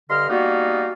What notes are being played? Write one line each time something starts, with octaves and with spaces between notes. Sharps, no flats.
G2 D3 D#5 C6 F6
G3 A#3 B3 D#4 F4 F#4